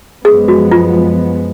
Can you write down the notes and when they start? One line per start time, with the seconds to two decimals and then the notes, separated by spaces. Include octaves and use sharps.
0.24 F#2 F3 G#3 B3 G#4
0.48 F#4
0.71 F4